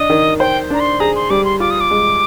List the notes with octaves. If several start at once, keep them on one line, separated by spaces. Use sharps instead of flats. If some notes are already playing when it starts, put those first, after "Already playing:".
Already playing: D4 D#5
D#3
C5 G5
D4 A#5
C6
G#4 A#5
C6
G3 D6
C6
F4 D6
D#6
D6
G#3